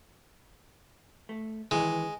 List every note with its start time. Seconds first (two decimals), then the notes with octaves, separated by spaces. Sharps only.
1.29 A3
1.71 D#3 E3 G#3